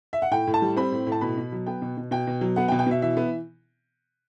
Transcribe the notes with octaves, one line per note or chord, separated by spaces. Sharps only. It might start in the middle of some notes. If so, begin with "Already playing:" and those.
E5
F#5
A2 G5
A2
A5
G3
C4 B5
A2
A2
A5
B2 B5
B2
F#3
B3 G5
B2
B2
B2 G5
B2
F#3
B3 F#5
G5
B2
G5
B2 E5
E3 E5
B3